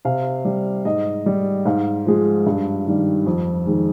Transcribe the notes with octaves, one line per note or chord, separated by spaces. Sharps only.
C3 F5
G3
G#2 D#5
G3
G#2 F5
F3 G#3
G2
D#3 G3
F2
D#3 G#3